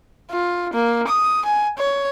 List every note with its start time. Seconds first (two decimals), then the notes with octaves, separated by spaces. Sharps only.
0.31 F4
0.74 A#3
1.07 D#6
1.45 G#5
1.78 C#5